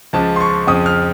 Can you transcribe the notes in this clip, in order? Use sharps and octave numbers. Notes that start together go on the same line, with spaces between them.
C#2 C#3 F3 A5
C6
C#6
F2 C#3 F3 D#6
F6